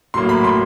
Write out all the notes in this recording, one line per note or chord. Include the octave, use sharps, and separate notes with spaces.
A2 F#3 A#3 C6
B5
C6